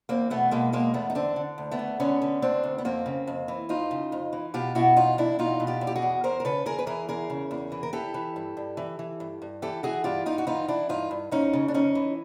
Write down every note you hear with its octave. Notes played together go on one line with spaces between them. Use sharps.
E2 A#3 C4
B2 A3 B3
B2 G#3 A#3
E2 G#3 A#3
E2 A3 B3
D#4
D3 C4 D4
D3
D2
A3 B3
D2
D3 B3 C#4
D3
D2 C4 D4
D2
B3
F2 A#3 C4
C#3
F2
E3
F2 D#4 F4
C#3
F2
E3
B2 F4 G4
B2 E4 F#4
E2 D#4 F4
E2 D4 E4
B2 D#4 F4
B2
F4 G4
E2
G4
F#4 G#4
E2
E2 A#4 C5
A#4
C#3 A4 B4
E2 G#4 A#4
B4
E3 G#4 A#4
E2 G#4 A#4
C#3
E2
E3
A#4
E3 G4 A4
E3
G2
G2
E3
E3
G2
G2
E3 G4 A4
E3 F#4 G#4
G2 F4 G4
G2 D#4 F4
F#4
E3 D#4 F4
E3 D4 E4
G2 D#4 F4
G2
F2 C#4 D#4
C#3
D4
F2 C#4 D#4
E3